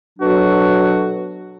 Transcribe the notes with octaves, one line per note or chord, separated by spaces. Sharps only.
B2 F#3 D4 F#4 A4